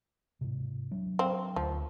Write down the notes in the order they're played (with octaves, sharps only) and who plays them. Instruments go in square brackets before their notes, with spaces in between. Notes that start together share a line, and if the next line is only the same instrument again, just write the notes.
[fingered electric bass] G#2 C3
F#3 D4
[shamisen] C4 F5
[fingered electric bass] D2 [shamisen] F3